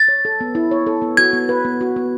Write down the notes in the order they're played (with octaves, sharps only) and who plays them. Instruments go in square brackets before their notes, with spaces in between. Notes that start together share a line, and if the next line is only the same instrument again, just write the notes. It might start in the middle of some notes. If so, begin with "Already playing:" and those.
Already playing: [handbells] A6
[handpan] C#5
A4
B3
E4
C#5
A4
B3
[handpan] F#4 [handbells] G#6
[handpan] B3
B4
B3
F#4
B3